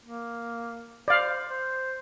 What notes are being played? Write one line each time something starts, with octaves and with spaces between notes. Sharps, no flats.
A#3
C5 D5 F5
C5